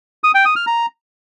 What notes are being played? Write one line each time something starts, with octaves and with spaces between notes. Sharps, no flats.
D#6
G5
D#6
F6
A#5